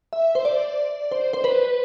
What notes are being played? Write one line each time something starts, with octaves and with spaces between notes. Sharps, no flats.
E5
C5
D5
C5
C5
B4